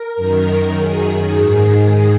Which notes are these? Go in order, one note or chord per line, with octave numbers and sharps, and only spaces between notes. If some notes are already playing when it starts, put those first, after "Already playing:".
Already playing: A#4
F#2 D#3
F#2 D#3 G#4
G#2 D#3